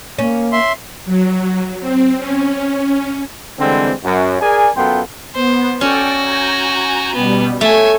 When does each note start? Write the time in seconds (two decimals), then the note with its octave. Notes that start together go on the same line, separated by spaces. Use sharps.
0.19 A#3 C#4
0.52 E5 C6
1.05 F#3
1.81 C4
2.18 C#4
3.60 D3 E3 G3 G#3 C4
4.04 F#2
4.41 G#4 A#4 D5 G#5
4.76 F#2 B3 F4 A4 G5 C6
5.35 B3 C5
5.81 C#4 F#4 A4 D5 G5
6.22 G#5 A#5 G6
7.15 B2 G3 B3
7.61 A3 C#5 E5 G#5